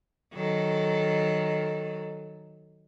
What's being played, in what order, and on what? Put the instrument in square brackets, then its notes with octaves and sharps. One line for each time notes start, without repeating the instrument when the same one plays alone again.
[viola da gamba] D#3 F#3 A4